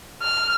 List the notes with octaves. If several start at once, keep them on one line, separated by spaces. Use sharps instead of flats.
F6